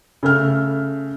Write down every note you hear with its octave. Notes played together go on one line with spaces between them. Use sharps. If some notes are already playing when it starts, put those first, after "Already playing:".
C#3 A3 F6